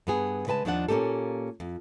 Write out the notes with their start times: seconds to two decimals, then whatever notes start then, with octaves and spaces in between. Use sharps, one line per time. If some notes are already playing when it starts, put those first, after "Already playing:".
0.07 G2 B3 G#4
0.47 C#3 G#3 B4 G#5 A5
0.65 D#2 F3 D4 F#5
0.88 A#2 A#3 C#4 G4 A4
1.60 F2